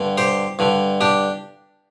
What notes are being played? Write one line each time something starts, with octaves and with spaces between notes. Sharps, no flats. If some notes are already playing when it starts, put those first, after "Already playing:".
Already playing: G2 D3
G4 C5
G2 D3
D4 G4